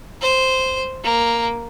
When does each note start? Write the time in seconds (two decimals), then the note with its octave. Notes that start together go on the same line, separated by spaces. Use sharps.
0.22 C5
1.04 A#3